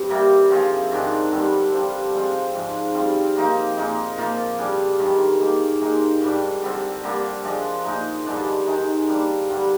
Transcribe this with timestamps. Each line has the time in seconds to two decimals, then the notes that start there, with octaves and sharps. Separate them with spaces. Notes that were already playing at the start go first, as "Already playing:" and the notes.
Already playing: G2 C4
0.09 C3 G3 A#3
0.50 F3 C4 F4 G#4
0.91 G#2 D#3 G#3 D4
1.32 G2 D3 G3 C4
1.72 G3 D4 F4 C5
2.13 F3 G#3 C4 F4
2.54 G#2 F3 G#3
2.95 G3 C4 F4
3.36 F3 A#3 D#4
3.77 A#2 G#3 D#4
4.18 A#2 F3 A#3 F4
4.59 G3 D4 G#4
4.99 G2 D#3 G#3
5.40 D#3 A#3 D#4 G#4
5.81 A#2 G#3 D#4 G4
6.22 G#2 G3 D4
6.63 D3 G3 C4
7.03 D3 G3 A#3
7.44 F3 G#3 D4
7.85 A#2 G#3 D#4
8.26 G2 D3 G#3 D4
8.67 D#3 G#3 D#4
9.08 G3 A#3 D4
9.49 G2 D3 G3